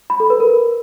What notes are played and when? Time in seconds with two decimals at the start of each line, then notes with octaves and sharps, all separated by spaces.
0.10 B5
0.20 A4
0.30 B4
0.40 A#4